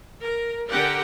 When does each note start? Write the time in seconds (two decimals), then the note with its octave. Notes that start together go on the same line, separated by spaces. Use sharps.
0.23 A#4
0.70 D3 G4 A#4 F#5 G5